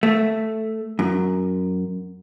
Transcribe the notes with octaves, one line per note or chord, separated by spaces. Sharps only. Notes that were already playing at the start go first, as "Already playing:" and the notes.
A3
F#2